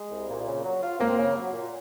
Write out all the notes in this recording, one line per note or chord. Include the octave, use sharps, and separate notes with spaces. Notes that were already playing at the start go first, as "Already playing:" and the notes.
Already playing: G#3
C2
A#2
C#3
F#3
F4
A#3 C4
C#3
F#3
A#2